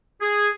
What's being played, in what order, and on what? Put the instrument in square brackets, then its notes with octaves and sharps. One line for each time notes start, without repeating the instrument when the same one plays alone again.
[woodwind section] G#4